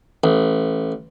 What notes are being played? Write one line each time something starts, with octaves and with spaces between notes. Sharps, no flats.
A1